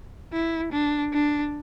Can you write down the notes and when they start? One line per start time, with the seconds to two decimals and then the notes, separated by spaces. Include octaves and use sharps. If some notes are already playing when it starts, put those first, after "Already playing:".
0.33 E4
0.72 D4
1.13 D4